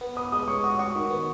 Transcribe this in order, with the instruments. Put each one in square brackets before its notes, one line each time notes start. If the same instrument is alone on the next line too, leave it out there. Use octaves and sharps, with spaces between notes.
[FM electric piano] B3
[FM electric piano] B4 [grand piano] D#6
[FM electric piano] G#3 [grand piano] D#6
[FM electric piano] C#5 [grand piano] C#6
[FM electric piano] F#4 [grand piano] D#6
[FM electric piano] F#4 [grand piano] C#6
[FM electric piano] D#3
B3